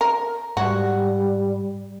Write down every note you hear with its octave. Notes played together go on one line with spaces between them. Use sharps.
A#4
G#2 G3 F#4